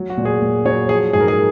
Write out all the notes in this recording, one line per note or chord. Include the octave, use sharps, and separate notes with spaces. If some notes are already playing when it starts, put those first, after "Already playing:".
Already playing: F#3
F#4
A#2
G#4
A#2
F#3 C#5
F3 G#4
G#2 G#4
A#4
G#4